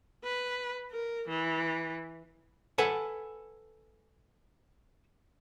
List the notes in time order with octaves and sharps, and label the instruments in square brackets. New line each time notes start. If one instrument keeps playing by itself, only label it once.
[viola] B4
A#4
E3
[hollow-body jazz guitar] A4 B4 F#5 G#5